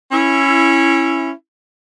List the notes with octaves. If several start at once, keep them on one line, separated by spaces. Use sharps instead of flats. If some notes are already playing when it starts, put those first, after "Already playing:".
C#4 E4